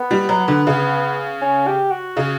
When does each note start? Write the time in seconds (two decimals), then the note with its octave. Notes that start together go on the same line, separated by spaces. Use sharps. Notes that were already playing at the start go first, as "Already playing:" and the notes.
Already playing: B3
0.11 G3
0.29 F#3
0.48 D3
0.67 C#3
1.42 C#4
1.67 G4
1.91 F#4
2.17 C#3